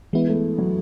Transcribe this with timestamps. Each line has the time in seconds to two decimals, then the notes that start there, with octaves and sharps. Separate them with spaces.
0.13 E3 G#3 B3 E4
0.29 A3
0.58 F#3